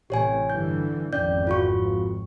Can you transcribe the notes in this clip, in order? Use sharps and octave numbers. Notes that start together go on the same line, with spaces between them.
A1 C3 G4 C#5 G#5
G2 D3 E3 G6
G#1 F2 C#4 D5 G6
F4 F#4 C#6